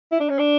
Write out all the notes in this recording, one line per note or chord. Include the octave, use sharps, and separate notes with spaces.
E4
D4
C#4
D4